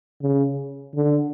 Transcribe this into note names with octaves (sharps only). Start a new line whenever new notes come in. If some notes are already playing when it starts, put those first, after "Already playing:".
C#3
D3